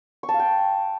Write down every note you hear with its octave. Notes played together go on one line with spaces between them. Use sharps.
C#6
A5
F5
G5